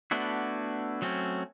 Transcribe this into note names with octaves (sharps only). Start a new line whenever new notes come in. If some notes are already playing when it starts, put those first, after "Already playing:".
A3 B3 D4 E4 F#4
F#3 A3 C4 C#4